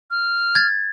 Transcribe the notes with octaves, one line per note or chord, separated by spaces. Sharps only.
F6
G#6 A6